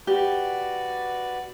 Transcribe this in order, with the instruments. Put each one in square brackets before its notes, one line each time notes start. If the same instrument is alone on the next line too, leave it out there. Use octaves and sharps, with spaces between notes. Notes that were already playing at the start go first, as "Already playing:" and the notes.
[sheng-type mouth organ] F#4 B4 D5 [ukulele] G4